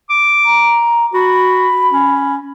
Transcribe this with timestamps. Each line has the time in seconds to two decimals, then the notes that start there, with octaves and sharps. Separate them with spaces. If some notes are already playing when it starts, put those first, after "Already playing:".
0.10 D6
0.45 A#5
1.14 F#4 B5
1.93 C#4